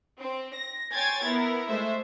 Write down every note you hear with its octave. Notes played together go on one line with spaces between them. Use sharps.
C4
A#6
C#5 G5 G#5 C6 G#6 A6
B3 E4 A#4
G#3 A3 C5 E5